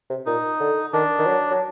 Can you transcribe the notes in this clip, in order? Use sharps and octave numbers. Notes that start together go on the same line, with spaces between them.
C3
A#2 D#4
D3
D#3 D4
D#3
F#3
F#3